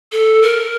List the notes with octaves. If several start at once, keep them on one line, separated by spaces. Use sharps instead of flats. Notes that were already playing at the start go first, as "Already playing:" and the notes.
A4
A#4